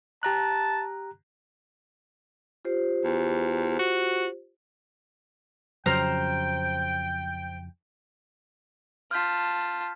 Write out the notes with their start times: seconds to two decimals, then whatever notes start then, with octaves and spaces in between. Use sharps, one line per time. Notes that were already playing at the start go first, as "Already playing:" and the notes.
0.23 G4 A5 A#5 F#6
2.65 F4 G4 C5
3.04 E2
3.79 F#4
5.86 F2 C#3 F#3 C5 G5 A#5 F6
9.11 F4 A5 F6 G6 B6